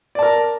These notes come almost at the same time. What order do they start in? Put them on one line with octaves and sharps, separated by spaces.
D5 A5 A#4